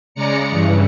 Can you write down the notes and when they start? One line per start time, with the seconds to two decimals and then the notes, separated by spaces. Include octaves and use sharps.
0.15 C#3 G#3 D5 A#5 C#7
0.51 G2 C#3 E3